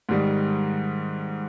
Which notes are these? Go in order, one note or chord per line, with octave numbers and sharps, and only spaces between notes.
G#2 D#3 G3